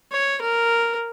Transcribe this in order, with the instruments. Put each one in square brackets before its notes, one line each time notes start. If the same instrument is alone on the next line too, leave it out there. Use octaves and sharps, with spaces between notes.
[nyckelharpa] C#5
A#4